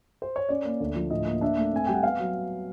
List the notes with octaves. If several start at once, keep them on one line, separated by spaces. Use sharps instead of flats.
C5
C#5
C#4 D5
A#3
D2
F3
A2 D#5
A#3
D4 E5
A3
C4 G#5
G3 G5
F#5
B3 F5
F#3